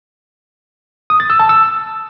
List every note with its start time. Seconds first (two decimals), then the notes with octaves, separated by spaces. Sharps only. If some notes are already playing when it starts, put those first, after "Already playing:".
1.10 D#6
1.20 A6
1.30 E6
1.40 A5
1.49 E6